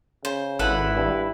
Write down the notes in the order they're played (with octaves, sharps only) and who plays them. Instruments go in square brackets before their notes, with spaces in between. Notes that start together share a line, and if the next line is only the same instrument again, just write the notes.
[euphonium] C#3 [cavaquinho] C5
[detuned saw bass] G#1 [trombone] E4 [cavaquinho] A4 B4 F#5
[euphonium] G2